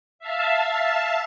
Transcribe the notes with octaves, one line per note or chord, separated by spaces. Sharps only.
E5 F5 A5